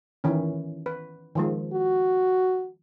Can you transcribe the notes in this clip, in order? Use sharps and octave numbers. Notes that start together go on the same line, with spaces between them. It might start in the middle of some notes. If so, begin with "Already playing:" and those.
D#3 E3 C#4
B4
D#3 F3 G#3
F#4